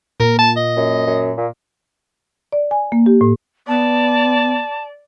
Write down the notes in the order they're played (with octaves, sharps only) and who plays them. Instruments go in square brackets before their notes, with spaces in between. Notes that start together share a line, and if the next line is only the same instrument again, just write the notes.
[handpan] A#2 [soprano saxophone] A#4
[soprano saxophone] A5
D#5
[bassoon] F#2
F#2
A#2
[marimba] D5
G#5
A#3
G4
A2
[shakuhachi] B3 [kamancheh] D5 [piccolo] A5